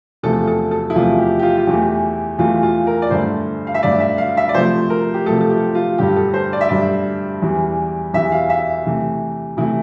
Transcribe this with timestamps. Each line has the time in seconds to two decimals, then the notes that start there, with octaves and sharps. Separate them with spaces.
0.23 E2 C3 F3 A3 A4
0.47 A4
0.71 A4
0.90 E4
0.95 E2 C3 F3 A3 F4
1.19 G4
1.39 G4
1.43 F4
1.57 F4
1.67 E2 E3 A3 G4
2.38 E2 E3 A3 F4
2.63 F4
2.87 A#4
3.02 D5
3.10 G2 D3 A3 C5
3.67 F5
3.74 E5
3.83 G2 D3 A3 D5
4.00 E5
4.18 F5
4.37 E5
4.49 D5
4.55 C3 F3 A3 C5
4.90 A#4
5.14 G4
5.26 C3 F3 A3 A4
5.41 A4
5.50 G4
5.75 F4
5.98 G2 D3 G3 G4
6.16 A4
6.34 C5
6.53 D5
6.61 E5
6.69 G2 D3 G3 D5
7.42 E2 E3 G3
8.13 E2 E3 G3 E5
8.32 F5
8.50 E5
8.85 C3 E3 A3
9.57 C3 E3 A3 E4